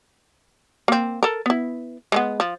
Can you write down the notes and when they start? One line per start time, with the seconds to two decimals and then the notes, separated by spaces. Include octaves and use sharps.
0.88 A#3 C4
1.23 A4 A#4
1.46 B3 E4
2.12 G#3 A3 B3
2.40 F3